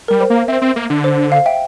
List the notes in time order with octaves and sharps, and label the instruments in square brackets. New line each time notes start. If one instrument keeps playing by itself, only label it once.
[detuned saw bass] G3 [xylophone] A#4
[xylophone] C5
[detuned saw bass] A#3
[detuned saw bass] C4 [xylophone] E5
[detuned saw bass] C4
A#3
D3
[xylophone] C5
F5
E5 G5